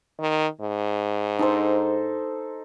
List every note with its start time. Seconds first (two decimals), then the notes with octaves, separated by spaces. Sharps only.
0.19 D#3
0.60 G#2
1.39 D#4 A4 C5